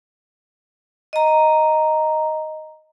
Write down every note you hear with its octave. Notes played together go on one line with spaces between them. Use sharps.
D#5 A#5